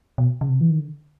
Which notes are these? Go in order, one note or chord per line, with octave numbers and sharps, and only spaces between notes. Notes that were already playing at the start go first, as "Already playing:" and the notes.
B2
C#3
C3
E3
D#3
D3